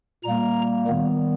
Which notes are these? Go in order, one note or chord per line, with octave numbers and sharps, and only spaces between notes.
A#2 G3 A#3 A#5
D#3 G3 B3